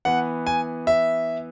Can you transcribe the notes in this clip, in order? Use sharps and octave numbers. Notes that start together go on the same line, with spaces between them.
E3 B3 F#5
G#5
E5